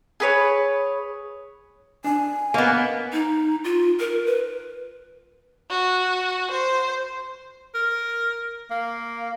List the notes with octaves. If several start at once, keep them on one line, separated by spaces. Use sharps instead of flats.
G#4 B4 C#5
D4 G#5
A#3 B3 C#5 D#5
D#4
F4
A#4
B4
F#4
C5
A#4
A#3